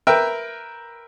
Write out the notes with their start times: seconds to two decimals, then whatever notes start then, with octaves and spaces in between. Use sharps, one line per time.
0.07 A#4 B4 E5 G5